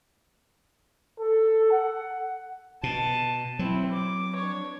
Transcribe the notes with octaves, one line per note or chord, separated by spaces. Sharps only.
A4
F#5
B2 A5
F#3 C4 E4
D6
D4 C#5